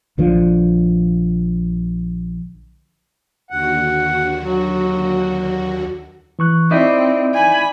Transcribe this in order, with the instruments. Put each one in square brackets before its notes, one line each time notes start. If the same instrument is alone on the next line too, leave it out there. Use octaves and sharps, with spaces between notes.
[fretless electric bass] A#1 D3 F3
[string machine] D#2 D3 F#4 [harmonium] F#5
[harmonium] F#3
[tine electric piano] E3 C#6 F#6
[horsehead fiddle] C4 [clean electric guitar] D#4 E4 [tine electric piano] D5 D6
[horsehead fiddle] G#5 B5